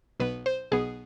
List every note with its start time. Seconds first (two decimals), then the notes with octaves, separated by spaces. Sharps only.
0.20 B1 B2 B3 B4
0.46 C5
0.72 B1 B2 B3 G#4